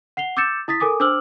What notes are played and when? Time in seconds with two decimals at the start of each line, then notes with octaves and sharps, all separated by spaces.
0.17 F#5 C7 F7 G7
0.37 D6 E6 G6 A6 C#7 E7
0.68 E4 D#6 A6 B6
0.80 A4 A#4 G#5 D6 D#6
1.00 D4 C5 D6 E6 F6 F#7